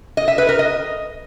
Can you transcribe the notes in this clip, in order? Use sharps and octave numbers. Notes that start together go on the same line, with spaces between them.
D#5
E5
B4
A#4
D#5